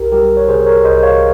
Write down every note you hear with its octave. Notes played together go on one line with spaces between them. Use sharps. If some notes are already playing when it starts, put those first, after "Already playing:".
Already playing: C2 G4 A#4
G3 G4 A#4
C#5
C3 G#4 C5
A#4 C#5
C2 C5 D#5
C#5 F5